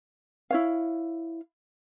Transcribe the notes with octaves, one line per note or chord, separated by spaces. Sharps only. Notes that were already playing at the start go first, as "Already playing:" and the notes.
E4 C#5 F5